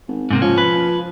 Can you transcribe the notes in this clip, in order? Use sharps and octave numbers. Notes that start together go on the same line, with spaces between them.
G#1
G#2 C3 A#3
F3 C#4
B4